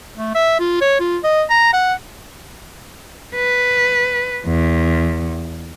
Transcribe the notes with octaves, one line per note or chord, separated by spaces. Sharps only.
A3
E5
F4
C#5
F4
D#5
A#5
F#5
B4
E2